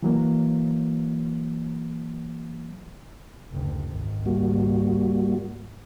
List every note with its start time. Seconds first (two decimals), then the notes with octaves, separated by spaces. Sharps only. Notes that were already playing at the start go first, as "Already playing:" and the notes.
0.03 E3 F#3 A#3
3.52 F#1 D2
3.84 G#1 C#2
4.26 G3 A#3 F#4